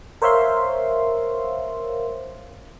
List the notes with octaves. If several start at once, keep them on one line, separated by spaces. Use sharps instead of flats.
A#4 C5 C#5 E5 F5 C6